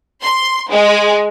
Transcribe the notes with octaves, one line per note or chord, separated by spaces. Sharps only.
C6
G#3